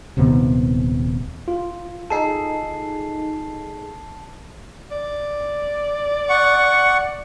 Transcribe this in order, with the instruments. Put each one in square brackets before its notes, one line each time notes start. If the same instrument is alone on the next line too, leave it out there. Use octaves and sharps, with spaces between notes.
[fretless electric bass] D#1 C3 D#3 B3
[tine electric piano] F4
[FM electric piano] D#4 G#4 A4 [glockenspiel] A5 C7
[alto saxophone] D5
[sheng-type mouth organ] F#5 C#6